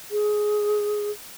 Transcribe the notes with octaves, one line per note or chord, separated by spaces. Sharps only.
G#4